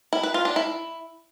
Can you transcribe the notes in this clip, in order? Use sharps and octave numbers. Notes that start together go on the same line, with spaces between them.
E4
B4
F4
D4
E4